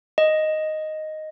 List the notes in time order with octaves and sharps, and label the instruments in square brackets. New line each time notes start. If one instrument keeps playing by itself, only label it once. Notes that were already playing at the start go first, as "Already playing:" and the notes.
[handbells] D#5